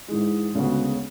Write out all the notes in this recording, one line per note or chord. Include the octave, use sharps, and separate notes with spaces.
G#2 E3 G#3
D2 C#3 G#3 B3 F#4